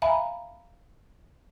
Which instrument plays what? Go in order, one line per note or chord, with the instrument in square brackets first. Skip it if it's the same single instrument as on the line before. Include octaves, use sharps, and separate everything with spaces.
[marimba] E5 F5 G#5 A#5 B5